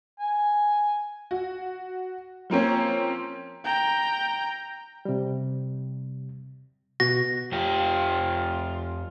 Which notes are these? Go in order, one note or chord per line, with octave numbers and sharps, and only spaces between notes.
G#5
F#4
F3 A#3 C4 C#4
G5 A#5
C3 G3
B2 F#4 A#6
F2 F4 G4